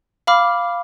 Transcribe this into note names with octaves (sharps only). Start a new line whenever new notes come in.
F5 B5 D6 F6